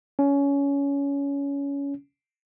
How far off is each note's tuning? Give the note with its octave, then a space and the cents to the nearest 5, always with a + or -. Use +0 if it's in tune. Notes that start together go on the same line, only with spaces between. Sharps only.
C#4 +20